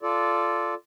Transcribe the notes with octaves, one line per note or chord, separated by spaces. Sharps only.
F4 A4 D5